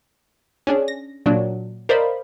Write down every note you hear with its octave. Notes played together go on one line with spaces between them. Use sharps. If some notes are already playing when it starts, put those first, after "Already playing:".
C#4 D4 G#4
A#6
A#2 F#3 D4
A#4 C5 D5 D#5 F5 B5